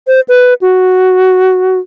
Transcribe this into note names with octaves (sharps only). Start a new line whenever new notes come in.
C5
B4
F#4